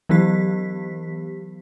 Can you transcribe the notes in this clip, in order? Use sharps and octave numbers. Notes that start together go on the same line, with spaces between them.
E3 F#3 B3 G4 B6